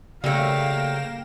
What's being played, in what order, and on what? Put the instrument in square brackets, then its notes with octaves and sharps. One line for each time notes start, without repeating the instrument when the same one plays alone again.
[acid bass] C#3 [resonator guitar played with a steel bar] G3 A3 [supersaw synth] A#3 A#6 E7 [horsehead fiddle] F5 G5